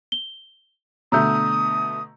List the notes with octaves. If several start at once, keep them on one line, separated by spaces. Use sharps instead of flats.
G7
B2 D3 A3 A#5 D#6 E6 G6